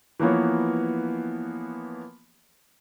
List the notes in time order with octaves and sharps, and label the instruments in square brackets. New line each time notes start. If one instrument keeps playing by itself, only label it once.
[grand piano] E3 F3 A#3 B3 C#5